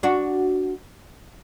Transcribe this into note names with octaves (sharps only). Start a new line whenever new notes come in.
D4 F#4